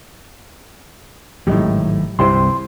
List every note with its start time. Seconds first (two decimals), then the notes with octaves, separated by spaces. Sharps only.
1.47 G#1 A2 F#3 G#3 D#4 G4
2.19 C2 G2 C3 E4 G4 C5 C6